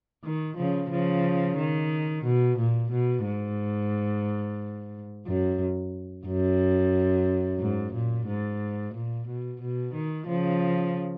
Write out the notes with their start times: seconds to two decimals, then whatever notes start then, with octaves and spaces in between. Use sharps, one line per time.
0.24 D#3
0.57 C#3 F3
0.91 C#3 F3
1.58 D#3
2.25 B2
2.59 A#2
2.91 B2
3.25 G#2
5.26 F#2
6.27 F#2
7.60 G#2
7.93 A#2
8.27 G#2
8.94 A#2
9.28 B2
9.62 B2
9.94 D#3
10.28 C#3 F3